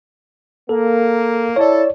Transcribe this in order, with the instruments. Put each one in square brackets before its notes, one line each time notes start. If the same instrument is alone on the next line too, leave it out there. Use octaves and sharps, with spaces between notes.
[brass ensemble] A#3 [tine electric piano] A4
[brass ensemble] E4 A4 [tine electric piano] C#5 D5